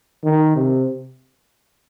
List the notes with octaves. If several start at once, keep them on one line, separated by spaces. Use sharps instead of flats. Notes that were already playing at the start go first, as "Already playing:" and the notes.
D#3
C3